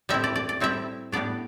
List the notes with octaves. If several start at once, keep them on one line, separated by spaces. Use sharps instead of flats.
A2 G3 C4 E4 E5
D5
D5
D5
A2 G3 C4 E4 E5
A2 G3 B3 D4 D5